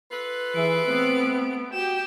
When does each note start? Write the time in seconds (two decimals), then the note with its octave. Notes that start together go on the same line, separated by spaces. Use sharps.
0.11 F4 A4 B4
0.55 E3 G#4 E5 D7
0.87 A3 B3 C4
1.74 F#4 G4 G5 E7